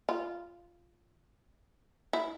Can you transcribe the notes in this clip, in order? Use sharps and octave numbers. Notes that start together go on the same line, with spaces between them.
F4
E4